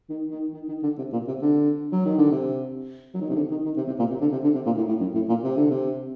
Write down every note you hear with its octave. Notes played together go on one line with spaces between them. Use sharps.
D#3
D#3
D#3
D#3
D3
C3
A#2
C3
D3
F#3
D#3
D3
C3
F#3
D#3
C3
D3
D#3
D#3
C3
C3
A#2
C3
D3
C3
D3
C3
A#2
A2
A2
F#2
A2
A#2
C3
D3
C3